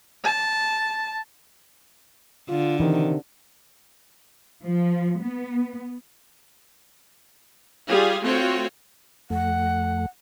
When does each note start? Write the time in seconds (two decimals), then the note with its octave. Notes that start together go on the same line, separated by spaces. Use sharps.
0.24 A5
2.49 D3 F4
2.80 C3 D#3 E3
4.64 F3
5.21 B3
7.88 G3 F4 G#4
8.23 A3 C4 F4 F#4 C#5 G5
9.30 F2 A3 F#5